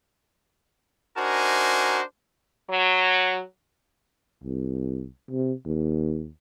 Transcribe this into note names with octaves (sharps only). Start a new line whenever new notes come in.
D4 D#4 F#4 A#4 C5 G#5
F#3
C2
C3
D#2